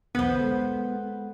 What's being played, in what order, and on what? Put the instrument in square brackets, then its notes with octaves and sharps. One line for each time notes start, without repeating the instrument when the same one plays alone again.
[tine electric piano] B1 E2 D3 [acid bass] B3 [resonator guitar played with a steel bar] B4 C5
[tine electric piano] G#3 A4 F#5